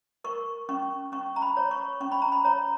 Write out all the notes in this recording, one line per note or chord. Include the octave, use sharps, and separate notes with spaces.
A#4 C#6
C#4 C#6
C#4 C#6
A#5
B5
C#5
C#6
C#4 C#6
B5
A#5
B5
C#5 A#5